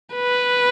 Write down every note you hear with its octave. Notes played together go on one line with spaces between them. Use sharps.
B4